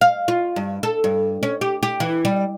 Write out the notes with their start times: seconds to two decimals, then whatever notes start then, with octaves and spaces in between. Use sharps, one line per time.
0.01 F5
0.28 F4
0.56 G2
0.83 A4
1.04 G2
1.43 C#4
1.61 G4
1.83 G4
2.00 E3
2.25 G3